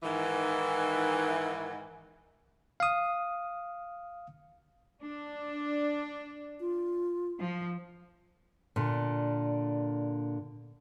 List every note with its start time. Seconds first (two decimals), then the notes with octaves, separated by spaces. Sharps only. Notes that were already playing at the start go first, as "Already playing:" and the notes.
0.03 G#2 D#3 E3
2.80 F5 D#6
5.02 D4
6.60 F4
7.38 F3
8.76 A#2 D3